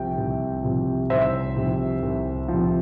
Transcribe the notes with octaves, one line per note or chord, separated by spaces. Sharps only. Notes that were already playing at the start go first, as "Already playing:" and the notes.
Already playing: C2 C3 F3 G5
C2
C3 F3
C2 C5 E5
C3 F3
C2
C3 F3